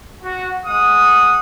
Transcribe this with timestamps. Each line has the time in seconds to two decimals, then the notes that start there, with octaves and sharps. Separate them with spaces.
0.23 F#4
0.66 G#3 F#5 D#6